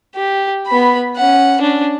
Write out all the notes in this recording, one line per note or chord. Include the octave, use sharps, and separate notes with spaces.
G4
B3 B5
C#4 F#5
C#4 D4